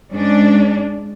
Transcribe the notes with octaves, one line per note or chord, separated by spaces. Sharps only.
G#2 G#3 C#4 D4